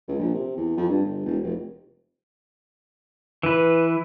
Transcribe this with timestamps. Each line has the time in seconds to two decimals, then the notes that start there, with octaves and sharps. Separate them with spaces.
0.08 C#2
0.19 A#1
0.34 C3
0.56 E2
0.77 F2
0.89 G2
1.04 G1
1.25 E1
1.43 F1
3.43 E3 B4